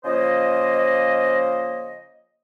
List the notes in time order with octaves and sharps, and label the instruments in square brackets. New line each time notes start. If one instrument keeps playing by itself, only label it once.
[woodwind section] C#3 F3 A#3 C5 D#5